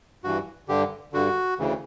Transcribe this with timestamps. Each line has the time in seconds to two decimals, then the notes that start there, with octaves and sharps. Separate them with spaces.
0.24 G2 E3 F#4
0.68 G2 D3 G4
1.13 G2 D3 F#4
1.59 D2 C#3 E3